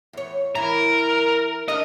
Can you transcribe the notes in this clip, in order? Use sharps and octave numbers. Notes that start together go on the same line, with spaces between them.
E2 C#5
E3 E4 A#4
D4 A4 A#4 D#5